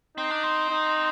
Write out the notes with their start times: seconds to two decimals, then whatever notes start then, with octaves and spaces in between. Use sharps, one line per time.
0.17 C4 D#4
0.31 D4
0.43 C4
0.70 D#4